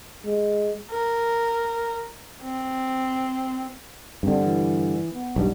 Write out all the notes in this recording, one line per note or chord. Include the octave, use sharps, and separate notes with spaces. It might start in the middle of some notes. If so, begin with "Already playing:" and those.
G#3
A#4
C4
G2 D3 C4
E3
B3
B1 G2